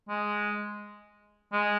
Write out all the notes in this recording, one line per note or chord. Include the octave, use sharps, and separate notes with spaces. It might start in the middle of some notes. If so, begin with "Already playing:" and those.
G#3
G#3